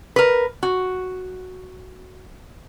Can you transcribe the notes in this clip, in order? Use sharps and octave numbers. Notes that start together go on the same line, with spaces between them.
A#4 B4
F#4